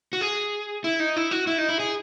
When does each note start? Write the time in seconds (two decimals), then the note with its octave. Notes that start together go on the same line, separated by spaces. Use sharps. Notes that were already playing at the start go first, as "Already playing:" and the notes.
0.13 F#4
0.21 G#4
0.84 E4
1.00 D#4
1.16 E4
1.31 F#4
1.47 E4
1.58 D#4
1.69 E4
1.80 G#4